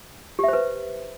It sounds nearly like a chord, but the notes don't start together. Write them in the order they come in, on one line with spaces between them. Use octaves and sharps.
G4 E5 C5 B4